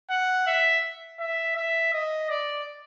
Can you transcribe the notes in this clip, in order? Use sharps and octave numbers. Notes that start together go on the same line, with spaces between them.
F#5
E5
E5
E5
D#5
D5